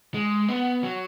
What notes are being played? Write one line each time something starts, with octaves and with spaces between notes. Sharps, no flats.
G#3
B3
F#3